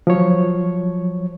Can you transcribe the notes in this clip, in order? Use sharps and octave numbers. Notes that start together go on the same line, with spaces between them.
F3 F#3 C#5